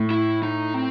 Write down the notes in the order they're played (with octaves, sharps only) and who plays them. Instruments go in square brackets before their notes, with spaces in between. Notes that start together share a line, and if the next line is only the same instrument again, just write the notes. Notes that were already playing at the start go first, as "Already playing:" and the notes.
Already playing: [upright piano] A2
[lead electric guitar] E4
D#4
C4